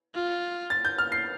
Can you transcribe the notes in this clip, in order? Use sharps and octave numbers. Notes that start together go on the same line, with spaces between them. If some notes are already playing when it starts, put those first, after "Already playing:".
F4
A6
G6
F6
C7